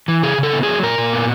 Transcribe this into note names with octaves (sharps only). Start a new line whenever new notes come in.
E3
C#3 G#4
C#3
A4
B3
F#3 G#4
A#2 A#4
A#2
B3